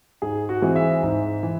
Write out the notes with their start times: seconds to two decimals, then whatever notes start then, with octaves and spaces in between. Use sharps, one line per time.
0.22 G#2 G#4
0.49 F#4
0.62 E3 G#3 C4
0.76 E5
1.03 G#2
1.43 E3